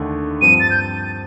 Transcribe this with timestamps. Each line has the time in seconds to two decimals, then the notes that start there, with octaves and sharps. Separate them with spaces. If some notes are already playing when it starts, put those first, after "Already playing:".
Already playing: D#2 D3 A3
0.41 G2 F3 C4 D#7
0.60 A6
0.70 G6